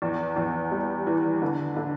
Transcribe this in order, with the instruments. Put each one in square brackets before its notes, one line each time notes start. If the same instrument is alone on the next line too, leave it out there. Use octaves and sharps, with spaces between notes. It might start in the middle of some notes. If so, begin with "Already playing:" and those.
[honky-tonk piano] E2
E2
G3
E3
D3
D3